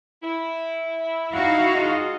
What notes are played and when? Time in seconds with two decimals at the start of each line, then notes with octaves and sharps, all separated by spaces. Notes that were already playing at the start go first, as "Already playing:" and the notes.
0.23 E4
1.33 D#4 F#4 F5
1.75 G#3 F4 D#5